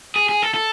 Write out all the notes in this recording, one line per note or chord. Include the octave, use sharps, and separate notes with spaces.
G#4
G#4
A4
A4